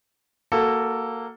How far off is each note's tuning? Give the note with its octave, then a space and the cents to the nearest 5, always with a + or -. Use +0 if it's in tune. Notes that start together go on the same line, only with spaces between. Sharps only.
A#3 -10 F#4 +0 A4 +5